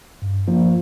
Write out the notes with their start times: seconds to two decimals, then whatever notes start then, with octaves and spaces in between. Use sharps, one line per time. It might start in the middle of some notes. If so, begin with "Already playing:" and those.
0.22 G2
0.48 F3 A#3 F4